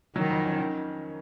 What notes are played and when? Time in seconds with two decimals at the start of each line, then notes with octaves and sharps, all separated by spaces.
0.16 D#3 F#3
0.30 F2
0.44 C#4
0.58 D#3